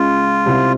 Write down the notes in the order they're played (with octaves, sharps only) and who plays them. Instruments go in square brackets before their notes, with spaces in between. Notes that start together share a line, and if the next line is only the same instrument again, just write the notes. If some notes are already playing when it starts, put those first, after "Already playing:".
Already playing: [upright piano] C#2 C#3 G#3 [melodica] F4
[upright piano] C2 C3 G3